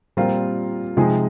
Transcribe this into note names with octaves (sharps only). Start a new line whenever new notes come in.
A#2 G3 C4 F4 A#4
C3 F3 G#3 D#4 G#4